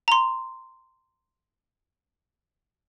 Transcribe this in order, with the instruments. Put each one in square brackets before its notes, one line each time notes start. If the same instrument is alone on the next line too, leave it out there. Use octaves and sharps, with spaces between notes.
[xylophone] A#5 C6